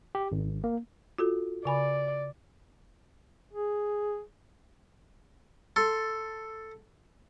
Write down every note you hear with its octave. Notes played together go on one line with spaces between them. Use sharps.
G4
G#1
A#3
F4 F#4 A4
C#3 D5 G#5 B5
G#4
A4 C6